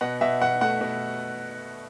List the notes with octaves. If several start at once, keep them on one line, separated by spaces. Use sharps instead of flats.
B2 F#5
B2 E5
B2 F#5
A3 F#5
B2